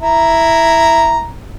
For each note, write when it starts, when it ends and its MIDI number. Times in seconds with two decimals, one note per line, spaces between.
0.01 1.28 64
0.01 1.28 82